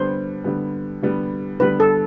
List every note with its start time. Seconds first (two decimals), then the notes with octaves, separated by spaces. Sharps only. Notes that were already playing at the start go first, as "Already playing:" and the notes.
Already playing: D3 G3 B3 C5
0.44 D3 G3 B3
1.03 D3 G3 B3
1.60 D3 G3 B3 B4
1.80 A4